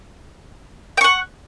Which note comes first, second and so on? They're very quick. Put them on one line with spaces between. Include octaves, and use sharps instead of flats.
G5 C#6 F#5